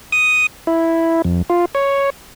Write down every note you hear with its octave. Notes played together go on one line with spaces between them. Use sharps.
D#6
E4
F2
F4
C#5